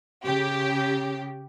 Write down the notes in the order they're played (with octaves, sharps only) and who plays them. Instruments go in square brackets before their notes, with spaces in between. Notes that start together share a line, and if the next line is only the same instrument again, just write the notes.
[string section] C#3 G4